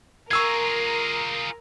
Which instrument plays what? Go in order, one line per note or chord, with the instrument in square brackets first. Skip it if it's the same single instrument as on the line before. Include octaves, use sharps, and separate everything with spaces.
[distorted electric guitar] F4 G#4 [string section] A#4 [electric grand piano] C#6 E6 G#6